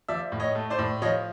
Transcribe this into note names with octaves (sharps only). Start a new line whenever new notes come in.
F3 D5 E5
A2
C#5 D#5
A3
C5 D5
A2
F3 C#5 D#5